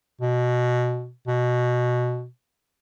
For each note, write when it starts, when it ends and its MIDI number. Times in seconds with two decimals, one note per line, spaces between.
0.22 1.11 47
1.28 2.27 47